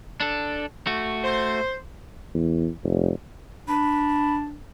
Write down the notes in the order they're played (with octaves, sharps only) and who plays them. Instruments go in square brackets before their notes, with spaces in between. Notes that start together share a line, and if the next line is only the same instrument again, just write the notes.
[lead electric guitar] D4 A4
A3 F#4
[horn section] C5
[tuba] E2
F1
[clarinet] D4 [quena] B5